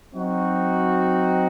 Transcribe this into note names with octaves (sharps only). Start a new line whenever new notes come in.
F#3 C4 D#4 F#4